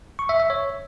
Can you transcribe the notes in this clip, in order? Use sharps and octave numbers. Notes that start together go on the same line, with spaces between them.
C#6
E5
E5
C#5